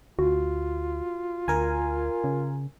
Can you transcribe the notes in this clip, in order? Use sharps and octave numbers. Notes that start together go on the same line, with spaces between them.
D2 F4 F#4
D2 A#4 G#5
C#3